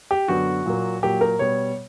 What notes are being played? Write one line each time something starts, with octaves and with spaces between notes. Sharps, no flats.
G4
F#2 D3 F#3 B3 F#4
A#2 F#3 A#3
A#2 F#3 A#3 G4
A#4
B2 G3 B3 C#5